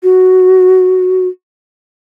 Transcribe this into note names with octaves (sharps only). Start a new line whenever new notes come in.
F#4